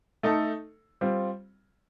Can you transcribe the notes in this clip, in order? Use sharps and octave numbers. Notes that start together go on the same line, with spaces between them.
A3 D#4 A4
G3 C4 F4